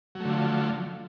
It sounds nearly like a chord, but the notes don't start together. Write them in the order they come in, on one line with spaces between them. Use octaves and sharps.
F#3 A3 D3 F3